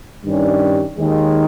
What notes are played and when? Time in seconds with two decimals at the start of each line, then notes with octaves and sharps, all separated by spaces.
0.25 G2 D#3 G3 C#4
0.98 D#2 D#3 G#3